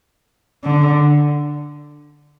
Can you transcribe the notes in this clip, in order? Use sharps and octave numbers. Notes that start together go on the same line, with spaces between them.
D3